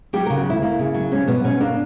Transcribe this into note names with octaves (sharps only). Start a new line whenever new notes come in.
F#3 G4
C#3 A#4
F#4
D2 E4
A#3
C#3
F#3
G3 C#4
B2 B3
B2 C#4
A#3 D4